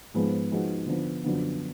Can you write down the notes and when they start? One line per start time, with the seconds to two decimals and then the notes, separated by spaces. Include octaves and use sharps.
0.14 G#2 F3 G#3 B3
0.51 F3 G#3 B3 D#4 F#4
0.86 D3 F3 B3
1.24 F#2 D3 F3 B3